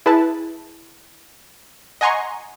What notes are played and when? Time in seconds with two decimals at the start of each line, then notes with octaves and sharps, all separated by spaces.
0.06 E4 G#4 B4 A5
2.01 D#5 F#5 G#5 A#5 C6 C#6